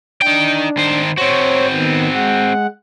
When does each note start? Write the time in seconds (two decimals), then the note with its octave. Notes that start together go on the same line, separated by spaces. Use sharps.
0.22 D4 D#4 G5
0.77 D#3 C5
1.17 C4 F#4 C5 C#5
1.72 D#3 B3
2.13 G#3 F#5